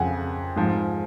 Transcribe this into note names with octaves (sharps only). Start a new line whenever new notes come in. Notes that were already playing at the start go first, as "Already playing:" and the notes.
Already playing: F2 C#3 F3 F#5 G#5
G#2 F3